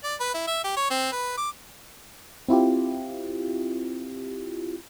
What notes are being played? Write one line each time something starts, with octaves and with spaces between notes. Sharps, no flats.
D5
B4
E4
E5
G4
C#5
C4
B4
D6
C4 E4 F4 G4